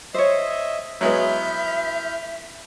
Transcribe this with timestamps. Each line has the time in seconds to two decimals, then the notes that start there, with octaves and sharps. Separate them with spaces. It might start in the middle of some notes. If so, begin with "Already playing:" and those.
0.14 C5 C#5 D#5 E5
1.01 F#3 G#3 B3 E4 E5 F6 G6